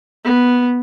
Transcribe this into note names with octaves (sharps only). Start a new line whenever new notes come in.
B3